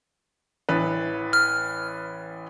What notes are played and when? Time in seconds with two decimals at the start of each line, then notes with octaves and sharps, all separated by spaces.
0.69 A1 E3 B4
1.33 F6